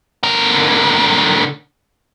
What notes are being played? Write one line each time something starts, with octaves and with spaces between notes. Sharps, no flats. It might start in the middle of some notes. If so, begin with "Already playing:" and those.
D3 A#4